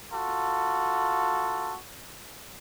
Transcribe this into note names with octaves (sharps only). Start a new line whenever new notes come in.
F4 F#4 A4